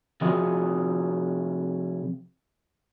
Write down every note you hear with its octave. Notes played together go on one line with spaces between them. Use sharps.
C3 F3 F#4 G#4 D#5